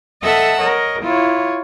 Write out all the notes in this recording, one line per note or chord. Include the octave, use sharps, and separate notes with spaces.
A4 D#5 E5 F#5 E6
A#4 C#5 D#5
E4 F4 C#5